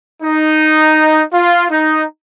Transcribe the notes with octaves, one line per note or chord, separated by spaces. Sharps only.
D#4
F4
D#4